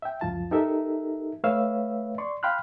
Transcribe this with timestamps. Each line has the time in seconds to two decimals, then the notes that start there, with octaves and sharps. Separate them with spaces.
0.02 E5 G5
0.21 C#2 F#2 F3 F4 A5
0.51 D#4 G4 A4 A#4 E5
1.44 A3 B4 C#5 E5 F5 E6
2.18 D5 C6 C#6
2.43 F5 G5 B5 C6 F6 F#6